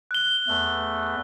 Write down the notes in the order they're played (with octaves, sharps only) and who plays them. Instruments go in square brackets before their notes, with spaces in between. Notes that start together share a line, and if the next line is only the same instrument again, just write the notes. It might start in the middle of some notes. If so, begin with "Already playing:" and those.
[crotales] F#6 G7
[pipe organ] E2 A3